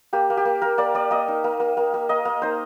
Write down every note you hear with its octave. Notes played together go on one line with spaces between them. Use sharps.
A#3 G4
A#3
G4
A#3
A#3 A#4
A#3 D5
A#3 D5
A#3 D#5
D#4
A#3
A#3
A#3
A#3
A#3 D#5
A#3
D#4 C5